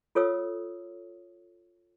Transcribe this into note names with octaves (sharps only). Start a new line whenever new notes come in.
F4 A4 C#5 D#6 E6